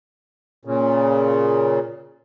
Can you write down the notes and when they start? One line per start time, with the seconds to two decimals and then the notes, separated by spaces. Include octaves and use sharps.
0.65 A#2 C#3